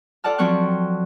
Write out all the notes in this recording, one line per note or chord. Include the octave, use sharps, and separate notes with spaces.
F4 A4 D5 F#5 A5 F6
F3 F#3 C4 F#5 C#6 F#6